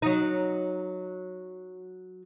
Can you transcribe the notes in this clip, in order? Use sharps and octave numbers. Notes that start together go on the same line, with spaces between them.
F#3 D#4